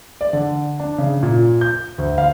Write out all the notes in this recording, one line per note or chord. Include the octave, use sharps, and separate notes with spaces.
D5
D3
D4
C#3
A#2
G6
D2
F5